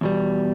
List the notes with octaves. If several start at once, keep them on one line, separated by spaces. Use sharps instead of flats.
E2 B2 G3